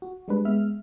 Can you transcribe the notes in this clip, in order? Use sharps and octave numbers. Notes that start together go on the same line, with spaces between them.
F#4
G3 G#3 D4 B4
G#3 B3 E5 F6